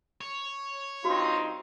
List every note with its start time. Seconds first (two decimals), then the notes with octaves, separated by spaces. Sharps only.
0.21 C#5
1.05 G2 C4 D#4 F4 F#4